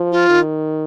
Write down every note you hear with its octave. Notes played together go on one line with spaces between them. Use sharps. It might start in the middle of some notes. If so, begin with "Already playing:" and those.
Already playing: F3
F4
D#3